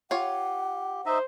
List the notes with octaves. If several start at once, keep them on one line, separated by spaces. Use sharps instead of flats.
F4 G4 C#5 F#5
D#4 C5 D#5 E5